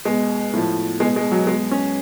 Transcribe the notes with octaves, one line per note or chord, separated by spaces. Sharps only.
B2 G#3
A2 F3
B2 G#3
G#3
F#3
B2 G#3
C#4